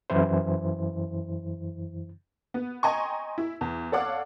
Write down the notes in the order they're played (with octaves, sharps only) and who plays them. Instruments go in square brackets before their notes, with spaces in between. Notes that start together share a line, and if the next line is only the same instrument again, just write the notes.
[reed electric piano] F#2 E3 E4 C5
[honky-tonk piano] B3
D#5 G5 G#5 A#5 C6 C#6
E4
E2
A4 C#5 D5 F5 F#5 D6